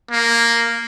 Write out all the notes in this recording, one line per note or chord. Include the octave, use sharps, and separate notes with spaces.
A#3